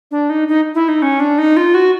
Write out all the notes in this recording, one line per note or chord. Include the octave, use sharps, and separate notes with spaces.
D4
D#4
D#4
E4
D#4
C#4
D4
D#4
F4
F#4